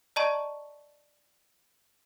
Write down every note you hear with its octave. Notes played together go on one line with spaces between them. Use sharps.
D5 D#5 A5 A#5 C#6